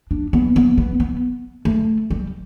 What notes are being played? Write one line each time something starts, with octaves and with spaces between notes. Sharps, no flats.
D4
B3
B3
B3
B3
A3
G3